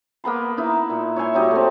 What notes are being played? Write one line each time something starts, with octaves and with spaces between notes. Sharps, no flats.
A#3 B3 B5 C6
D#4 E4 B4
A#2
C#5 E5 G#5 C6
F#3 G3 D#4
A3 C4